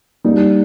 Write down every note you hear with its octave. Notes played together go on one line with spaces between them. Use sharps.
G3 A#3 D#4